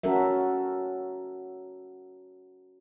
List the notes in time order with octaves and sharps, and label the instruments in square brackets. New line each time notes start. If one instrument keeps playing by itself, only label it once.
[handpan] C#4 F#4 A4 A#4 E5